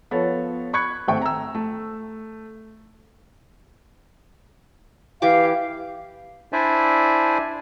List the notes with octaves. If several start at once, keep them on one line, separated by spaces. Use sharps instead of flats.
F3 B3 A4 C#5
B5 C#6 F#6 G#6 C#7
G#1 A3 C4 E5 G5 C#6
A#5 E6
A3
E3 G4 F5 D6
D4 E4 C5 D5 E5 G#5